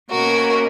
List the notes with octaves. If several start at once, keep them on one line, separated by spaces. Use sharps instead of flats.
B2 A#3 C#4 F#4 A#4